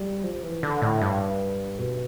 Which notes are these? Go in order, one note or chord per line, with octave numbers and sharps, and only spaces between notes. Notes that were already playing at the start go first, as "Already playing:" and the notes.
Already playing: G3
F3
E3
D3
A2
G2
B2